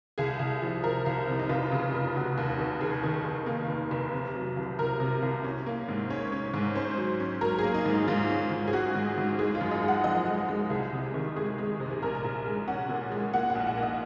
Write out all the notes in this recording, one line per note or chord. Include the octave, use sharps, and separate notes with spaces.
C2 G#4
C2
F3
F3 A#4
C2
C3
D#4
F1 F4
C#3
F1
C#3 F#4
D#2
F1
D#2 G#4
D#3
F1
A#3
F1
F1
C3
F#3
C2
C3 A#4
C3
C2
C#4
A#3
G#2
C#4 C#5
C#4
G#2
C#4 C5
F#3
C#4
F#3 A#4
A#3 G#4
D#4
G#2
D#4
G#2 F4
C#4
G#2
G#4
C#4 F#4
G#2
G#2
G#3 G#4
F4
F#2
D#5
G#3
F#5
F3 D#5
G#3
G#3
C2 G#4
C3
D#3
G#3 G#4
G#3
C3
G#4
A#1 A#4
A#1
G#3
C#4 F#5
A#2
G#3
A#3 F#5
F#5
A#1
F#5
A#3
D#5